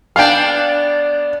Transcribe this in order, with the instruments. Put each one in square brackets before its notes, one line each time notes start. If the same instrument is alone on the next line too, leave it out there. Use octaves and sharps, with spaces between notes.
[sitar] B3 D4 [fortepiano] F5 G5